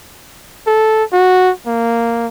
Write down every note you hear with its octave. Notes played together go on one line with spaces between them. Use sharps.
A4
F#4
A#3